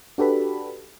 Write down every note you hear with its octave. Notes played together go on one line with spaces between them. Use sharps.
D4 F#4 G4 A4 B4 B5